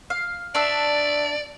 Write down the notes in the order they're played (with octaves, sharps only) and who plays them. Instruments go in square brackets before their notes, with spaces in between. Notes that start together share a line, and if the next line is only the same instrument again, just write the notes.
[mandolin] F5
[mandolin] D4 E5 [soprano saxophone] D5